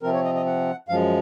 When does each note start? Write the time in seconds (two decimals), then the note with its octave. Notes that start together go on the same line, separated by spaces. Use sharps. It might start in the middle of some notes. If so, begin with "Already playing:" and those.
0.03 C3 F3 C4 A#4
0.13 C#5
0.24 D#5
0.34 D#5
0.46 F#5
0.88 F#2 F3 G#3 F5